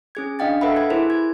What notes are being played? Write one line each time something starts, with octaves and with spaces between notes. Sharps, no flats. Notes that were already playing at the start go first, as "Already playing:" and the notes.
C#4 G#4 G#6
D4 D#5 F5 G5 A6
A4 B4 E5 F#5 B5
B5 G#6
E4 G#4 A#4 C5
G#6